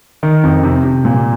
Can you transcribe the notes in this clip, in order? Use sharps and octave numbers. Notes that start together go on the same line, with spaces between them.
D#3
F2
C3
C3
A#2